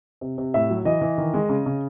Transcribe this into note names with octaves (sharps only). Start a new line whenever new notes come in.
C3
C3
A2 E5
F#3
E3 D#5
E3
D#3
G#3
C#3
C#3